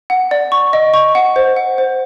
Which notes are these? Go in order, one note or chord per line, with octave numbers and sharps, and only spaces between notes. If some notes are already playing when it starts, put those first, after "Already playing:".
F#5
D5
C#6
D#5
C#6
F#5
C5
F#5
C5